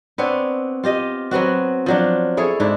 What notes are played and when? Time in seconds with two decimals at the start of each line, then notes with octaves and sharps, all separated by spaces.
0.18 B3 C4 D4 C#5
0.84 F4 G4 D#5
1.31 F#3 B3 C4 F#4
1.86 F3 F#3 D4
2.37 E4 G#4 A4 C#5
2.60 G#2 D4 E4